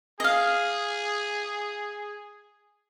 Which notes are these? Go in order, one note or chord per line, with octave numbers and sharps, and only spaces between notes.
G#4 D#5 F5